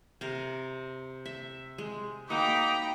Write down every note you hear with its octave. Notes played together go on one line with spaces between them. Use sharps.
C3 A#4
E5
G#3
A#3 D#4 F#4 G5 A#5 B5 D6